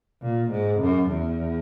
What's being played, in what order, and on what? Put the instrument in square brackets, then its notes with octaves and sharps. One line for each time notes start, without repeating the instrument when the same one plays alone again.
[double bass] A#2
G#2
F#2
E2